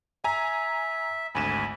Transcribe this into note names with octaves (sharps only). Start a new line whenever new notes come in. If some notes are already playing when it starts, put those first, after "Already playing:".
E5 G#5 A#5
G#1 D2 G#5 B5 E7